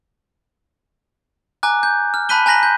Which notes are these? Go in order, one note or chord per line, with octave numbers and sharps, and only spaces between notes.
G#5 A#5 D6 F#6
G6
F6
A5 B5 F#6 B6 D#7 G7
G#5 A#5 F#6 A#6 B6 F#7
G6